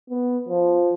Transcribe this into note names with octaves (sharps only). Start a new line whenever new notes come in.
B3
F3